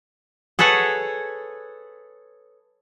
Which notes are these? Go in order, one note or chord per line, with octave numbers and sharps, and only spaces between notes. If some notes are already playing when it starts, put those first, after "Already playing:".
G#4 A4 B4 C#5 F#5